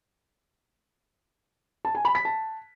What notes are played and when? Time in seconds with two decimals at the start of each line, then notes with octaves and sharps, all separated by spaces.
1.85 A5
1.95 G#5
2.05 B5
2.15 B6
2.25 A5